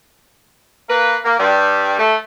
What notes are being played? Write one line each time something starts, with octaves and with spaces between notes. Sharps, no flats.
A#3 B4
A#3
G2 G3
A3